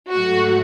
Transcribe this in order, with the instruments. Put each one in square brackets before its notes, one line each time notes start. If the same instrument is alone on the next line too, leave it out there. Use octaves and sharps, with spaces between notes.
[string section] G#2 F#3 A3 F#4